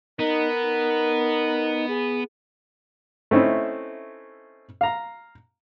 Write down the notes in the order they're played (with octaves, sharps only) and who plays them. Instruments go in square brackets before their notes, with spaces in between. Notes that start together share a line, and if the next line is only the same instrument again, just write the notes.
[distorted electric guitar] B3 [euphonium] D#4 [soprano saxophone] A#4
[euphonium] D#4
G#4
[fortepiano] A3 C4 C#4 D#4 E4
F5 A#5